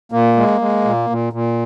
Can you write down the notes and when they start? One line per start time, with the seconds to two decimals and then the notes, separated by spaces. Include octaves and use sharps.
0.12 A#2 A#3
0.36 G#3
0.61 G#3
0.85 A#2
1.10 A#2
1.33 A#2